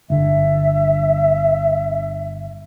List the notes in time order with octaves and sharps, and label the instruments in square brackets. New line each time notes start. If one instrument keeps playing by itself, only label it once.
[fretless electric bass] G1 D3 [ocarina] E5